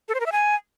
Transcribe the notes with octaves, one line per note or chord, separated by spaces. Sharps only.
A4
C5
A#4
E5
G#5